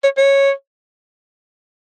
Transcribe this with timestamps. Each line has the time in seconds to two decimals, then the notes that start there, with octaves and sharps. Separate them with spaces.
0.04 C#5
0.17 C#5